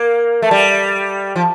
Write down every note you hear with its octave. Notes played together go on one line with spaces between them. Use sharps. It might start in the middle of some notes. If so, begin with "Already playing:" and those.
Already playing: A#3
A3
G3
F3